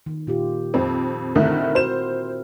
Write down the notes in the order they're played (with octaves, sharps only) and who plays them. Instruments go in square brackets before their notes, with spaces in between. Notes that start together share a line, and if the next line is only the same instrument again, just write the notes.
[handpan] D#3
A#2 F4 G4
[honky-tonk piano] F2 C4
[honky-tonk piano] D3 D#3 A3 [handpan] C4 E4 A#4
[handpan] F#4 [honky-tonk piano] C5 E7